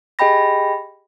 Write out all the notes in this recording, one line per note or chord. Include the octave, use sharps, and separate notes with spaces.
G4 G#4 D#5 G5 B5 A#6